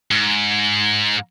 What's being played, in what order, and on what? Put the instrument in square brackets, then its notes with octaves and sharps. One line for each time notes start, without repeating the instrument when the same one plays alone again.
[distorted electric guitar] G#2